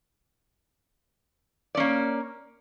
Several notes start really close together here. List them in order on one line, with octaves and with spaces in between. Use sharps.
D5 C#4 A#3